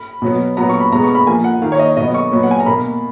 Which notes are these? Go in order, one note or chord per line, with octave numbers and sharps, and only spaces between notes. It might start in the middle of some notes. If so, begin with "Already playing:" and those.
Already playing: B5
B2 F#3 B3
A#2 F#3 B3 A#5
C#6
B5
B2 G#3 B3 A#5
C#6
B5
A#2 F3 A#3 G#5
F#5
D#3 A#3 F5
C#5
D#5
B2 F#3 B3 D#5
C#6
A#2 F#3 B3
F#5
G#5
A#5
B2 A#3 B5